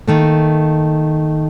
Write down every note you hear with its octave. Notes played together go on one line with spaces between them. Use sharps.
D#3 A3 A#3